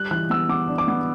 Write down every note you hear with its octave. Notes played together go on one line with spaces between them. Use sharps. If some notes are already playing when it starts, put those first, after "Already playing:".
Already playing: G3 F#6
E3 F#6
B3 E6
B3 D6
D4
D6
B3